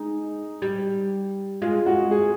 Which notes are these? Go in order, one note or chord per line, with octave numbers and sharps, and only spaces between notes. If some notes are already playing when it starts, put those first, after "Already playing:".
Already playing: G#3 D#4
G3
G#3 F4
F#4
G#4